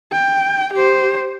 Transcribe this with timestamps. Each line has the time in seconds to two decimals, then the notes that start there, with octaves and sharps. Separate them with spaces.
0.12 G5
0.73 G4 C5